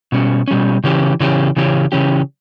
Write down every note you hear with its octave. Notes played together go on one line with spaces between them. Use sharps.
B2 G3 C#4
B2 G3 C#4
C#3 E3 C#4 G4
C#3 E3 C#4 G4
C#3 E3 C#4 G4
C#3 E3 C#4 G4